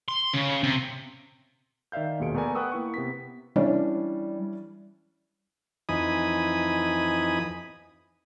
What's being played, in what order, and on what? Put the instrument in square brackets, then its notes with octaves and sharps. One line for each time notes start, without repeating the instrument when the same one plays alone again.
[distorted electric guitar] C6
C#3
C3
[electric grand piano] D#3 D5 E5 F5 G6
A#1 D#2 B2 G#4 C#7 D7
A3 B3 A#4 D5 G#5
B4 F#5 G5 C#6 D#6 E6
A#3 E4 C#6
C3 B3 B6
[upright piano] E3 C#4 D4 [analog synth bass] G3
[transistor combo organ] F2 E3 D#4 G#5 B5 D#6